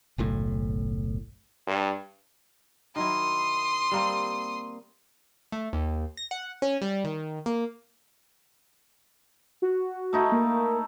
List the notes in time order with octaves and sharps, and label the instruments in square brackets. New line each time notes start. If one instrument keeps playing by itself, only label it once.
[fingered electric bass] F#1 B1 A2
[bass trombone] G2
[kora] D#3 F#3 E4 [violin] C6 D#6
[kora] G3 A#3 C4
[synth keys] A3
D#2
A#6
F#5
C#4
G3
D#3
A#3
[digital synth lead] F#4
[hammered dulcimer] A3 D#4 E4
[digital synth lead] A#3